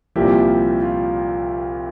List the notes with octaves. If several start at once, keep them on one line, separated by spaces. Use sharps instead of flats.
C2 A#2 F3 E4 G4
F4